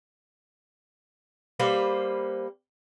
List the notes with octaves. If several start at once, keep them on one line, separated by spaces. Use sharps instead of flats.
G3 A#3 B4 C5